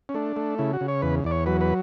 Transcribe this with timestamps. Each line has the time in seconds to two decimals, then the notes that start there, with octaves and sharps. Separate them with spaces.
0.09 C#4
0.14 A3 D4
0.36 A3
0.58 C#3 E4
0.73 F#4
0.81 C#3
0.88 C#5
1.02 E2 B4
1.24 E2 D5
1.31 C#5
1.46 F#3 B4
1.61 B4